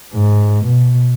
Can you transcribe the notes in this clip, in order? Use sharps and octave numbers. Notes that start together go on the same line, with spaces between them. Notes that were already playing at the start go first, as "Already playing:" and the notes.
G#2
B2